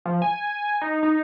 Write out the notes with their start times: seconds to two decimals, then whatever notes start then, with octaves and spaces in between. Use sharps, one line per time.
0.05 F3
0.22 G#5
0.82 D#4
1.03 D#4